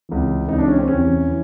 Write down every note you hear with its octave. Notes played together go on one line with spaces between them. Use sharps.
C#2 C3 E3
C#2 C3 E3 D#4
D4
C#4
C4
E2 C3 E3 C#4
E3